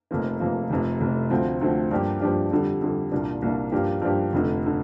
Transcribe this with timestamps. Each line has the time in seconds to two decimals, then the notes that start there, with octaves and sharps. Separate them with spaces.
0.11 F1 F2 F3 A#3
0.40 F1 F2 F3 A#3
0.70 F1 F2 C3
1.01 F1 F2 C3
1.30 D2 D3 F3 C4
1.61 D2 D3 F3 C4
1.91 G2 F3 A#3 D4 G4
2.21 G2 F3 A#3 D4 G4
2.51 F2 D3 G3
2.81 F2 D3 G3
3.11 C2 A#2 A#3 D4
3.42 C2 A#2 A#3 D4
3.72 G2 F3 A#3 D4 G4
4.02 G2 F3 A#3 D4 G4
4.33 F1 F2 D3
4.66 D3